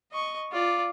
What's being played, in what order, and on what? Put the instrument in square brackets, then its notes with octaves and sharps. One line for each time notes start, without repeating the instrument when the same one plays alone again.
[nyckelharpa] D#5 C#6
F4 D5